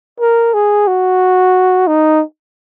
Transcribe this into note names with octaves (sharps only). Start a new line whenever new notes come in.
A#4
G#4
F#4
D#4